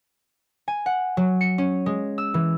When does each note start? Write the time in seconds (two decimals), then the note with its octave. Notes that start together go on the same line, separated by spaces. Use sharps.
0.68 G#5
0.86 F#5
1.17 F#3
1.41 C#7
1.58 C#4
1.86 G#3
2.18 E6
2.34 E3